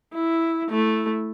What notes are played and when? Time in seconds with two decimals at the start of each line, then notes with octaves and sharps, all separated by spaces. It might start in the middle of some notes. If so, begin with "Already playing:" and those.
0.14 E4
0.70 A3 E4